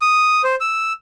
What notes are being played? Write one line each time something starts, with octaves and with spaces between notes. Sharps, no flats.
D#6
C5
E6